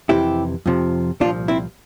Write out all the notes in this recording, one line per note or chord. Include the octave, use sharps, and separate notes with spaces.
F2 C3 E3 E4 G4
F2 C3 F3
C2 A#2 F3 D4 F4
C4 E4